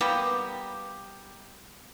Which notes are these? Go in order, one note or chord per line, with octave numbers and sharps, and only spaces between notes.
G3 A#3 B3 G4